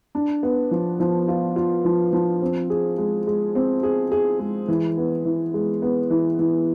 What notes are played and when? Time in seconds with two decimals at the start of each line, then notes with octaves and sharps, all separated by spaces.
0.15 D4
0.43 B3
0.71 F3
1.00 F3
1.28 F4
1.56 F4
1.85 F3
2.13 F3
2.42 C4
2.70 G#4
2.98 G#3
3.27 G#3
3.55 C4
3.83 G#4
4.12 G#4
4.39 G#3
4.68 E3
4.97 B3
5.25 E3
5.54 G#3
5.82 B3
6.10 E3
6.39 E3